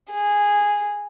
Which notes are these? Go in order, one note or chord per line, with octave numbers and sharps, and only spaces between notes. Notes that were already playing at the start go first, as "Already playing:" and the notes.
G#4